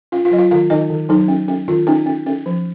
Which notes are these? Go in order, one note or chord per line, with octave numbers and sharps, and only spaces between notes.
C#4 F4 F5
F4 F5
F#3 D#5
F4 F5
D#3 F4 F5
D#3 D#4 D#5
D#3
F#3 D#4
C#4
C#4
D#3 F4
C#4 D#4
C#4
C#4
F3